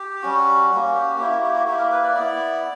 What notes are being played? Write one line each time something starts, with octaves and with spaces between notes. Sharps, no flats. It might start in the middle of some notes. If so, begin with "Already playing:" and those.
Already playing: G4
G3 C#4 F#4
A#3 C#4 F#4
G4
A#3 E4 G4
F#4
G4
F#4
A#3 E4 G4
A#4
B4
D5
B3 E4